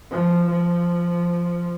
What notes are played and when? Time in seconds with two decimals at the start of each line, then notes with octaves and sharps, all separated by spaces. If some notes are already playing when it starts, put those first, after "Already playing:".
0.11 F3
0.50 F3